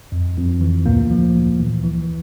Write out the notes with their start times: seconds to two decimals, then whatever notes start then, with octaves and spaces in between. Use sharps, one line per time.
0.12 F2
0.37 F2
0.61 E3
0.86 D2 A#2 A#3
1.11 F3
1.35 D2
1.59 E3
1.84 E3